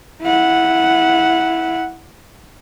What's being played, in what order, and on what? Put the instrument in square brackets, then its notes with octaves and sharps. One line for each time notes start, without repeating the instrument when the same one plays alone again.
[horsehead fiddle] E4 F#5